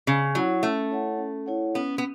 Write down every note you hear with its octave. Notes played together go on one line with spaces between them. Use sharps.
C#3 C#4
F#3 E4 C#5 F#5
A3 C#4
E4 C#5 F#5
C#4
E4 C#5 F#5
B3 C#4
B3